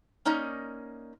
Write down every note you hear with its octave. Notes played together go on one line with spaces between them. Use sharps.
A#3 C#4 D#4 D5 D#5 A#5